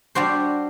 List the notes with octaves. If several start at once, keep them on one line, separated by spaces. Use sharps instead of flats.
G3 D4 F#4 C5